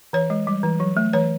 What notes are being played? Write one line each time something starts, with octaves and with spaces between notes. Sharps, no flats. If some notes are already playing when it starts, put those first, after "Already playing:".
E3 C#5
G#3
G3
E3
F#3
A3
E3 C#5